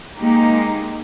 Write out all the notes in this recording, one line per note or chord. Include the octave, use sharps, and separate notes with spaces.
G#3 A#3 D#4 G4